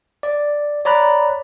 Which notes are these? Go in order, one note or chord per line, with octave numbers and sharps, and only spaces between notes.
D5
C#5 D5 A#5 B5 F#6